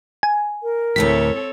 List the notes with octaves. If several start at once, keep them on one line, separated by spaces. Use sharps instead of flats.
G#5
A#4
D2 A2 C4 G4 A4 C#5 B6